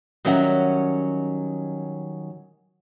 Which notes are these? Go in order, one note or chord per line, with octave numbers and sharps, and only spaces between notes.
D#3 F#3 G3 C#4 E5 F#5